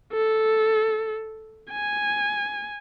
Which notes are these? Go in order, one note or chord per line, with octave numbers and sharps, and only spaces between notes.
A4
G#5